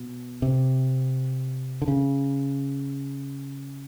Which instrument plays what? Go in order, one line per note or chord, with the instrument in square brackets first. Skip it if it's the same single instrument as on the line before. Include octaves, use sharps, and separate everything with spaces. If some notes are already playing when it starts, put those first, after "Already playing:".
Already playing: [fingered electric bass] B2
C3
D3
C#3